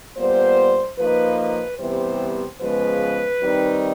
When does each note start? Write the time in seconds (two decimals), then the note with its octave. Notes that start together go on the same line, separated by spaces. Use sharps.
0.17 A#2 G3 B3 C5
0.98 F3 A#3 D#4 B4
1.39 B4
1.79 C3 E3 G3 B3 C5
2.60 C#3 F3 G#3 B3 B4
3.41 D#3 G3 C4 D#4